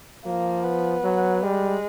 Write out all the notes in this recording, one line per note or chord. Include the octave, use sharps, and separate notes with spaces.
F3 A#3
B3
F#3
G3 G#3